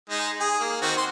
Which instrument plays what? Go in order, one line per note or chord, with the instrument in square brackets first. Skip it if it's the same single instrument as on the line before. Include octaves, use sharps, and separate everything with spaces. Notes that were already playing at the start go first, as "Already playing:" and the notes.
[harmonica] G#3 D#4
G#4
A#3
D#3 C4 F#4
F#4 C6